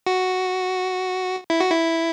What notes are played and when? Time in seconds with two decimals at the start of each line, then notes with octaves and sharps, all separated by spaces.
0.07 F#4
1.50 E4
1.60 F#4
1.71 E4